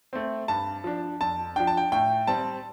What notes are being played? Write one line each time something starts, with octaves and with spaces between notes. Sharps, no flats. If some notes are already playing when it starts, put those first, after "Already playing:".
A3 C4
G2 A5
F3 D4
F2 A5
F3 D4 G5
A5
G5
A2 G5
G3 C4 A5